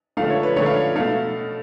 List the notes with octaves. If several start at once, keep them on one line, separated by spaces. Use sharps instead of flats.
D3 F3 A3 F5
C#5
B4
D3 F3 A3 C#5
F5
B2 A3 F5